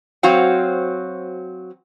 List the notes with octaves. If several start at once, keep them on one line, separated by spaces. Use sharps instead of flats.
F#3 C4 F#4 C5 F5